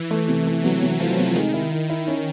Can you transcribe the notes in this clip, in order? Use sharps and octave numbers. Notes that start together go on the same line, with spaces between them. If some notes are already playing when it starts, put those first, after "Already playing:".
Already playing: E3
A3
C3
A3
C3 F#3
C3
F3 A3
C3
D#3 G#3
E4
E4
E4
C#4